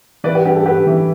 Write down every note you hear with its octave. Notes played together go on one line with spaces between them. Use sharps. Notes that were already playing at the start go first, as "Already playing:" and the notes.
E3 B4 D5
G4 B4
G2 G4
A4
G2 G4 B4
E3